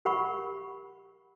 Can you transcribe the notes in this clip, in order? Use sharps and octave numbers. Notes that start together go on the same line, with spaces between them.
G4 A#4 F#5 B5 C#6